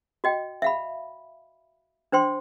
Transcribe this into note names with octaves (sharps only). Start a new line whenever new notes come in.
F#4 D#5 G5
E5 F5 B5
D4 C5 G5 C6